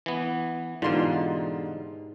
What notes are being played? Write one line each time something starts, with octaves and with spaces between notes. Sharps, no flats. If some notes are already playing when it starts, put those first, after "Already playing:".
E3 B3
G#2 B2 D3 E3 D#4 F4 G4 C6